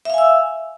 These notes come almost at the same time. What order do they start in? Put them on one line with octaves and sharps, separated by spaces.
E5 F5 G#5 E6